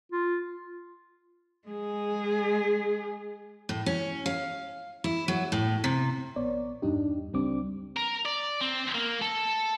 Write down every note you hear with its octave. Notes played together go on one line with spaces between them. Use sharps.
F4
G#3 G#4
A2
C#4
F5
E4
F#3
A2
C3
A#1 B3 C#5 D5
E2 G2 G3 D4 D#4 G4
C#2 G3 C4 D4 D6
A#4
D5
C4
A#3
A4